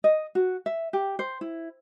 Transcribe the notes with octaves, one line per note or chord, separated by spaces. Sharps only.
D#5
F#4
E5
G4
C5
E4